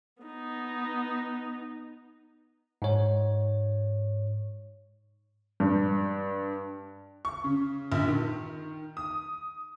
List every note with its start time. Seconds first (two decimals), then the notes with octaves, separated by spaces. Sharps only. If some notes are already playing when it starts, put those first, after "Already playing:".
0.23 B3 D#4
2.82 G#2 C#5
5.60 G2
7.25 C#6
7.44 C#3
7.92 A#1
8.08 D#3
8.97 D#6